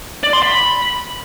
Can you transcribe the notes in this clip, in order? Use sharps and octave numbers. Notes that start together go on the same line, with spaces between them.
D5
C6
B5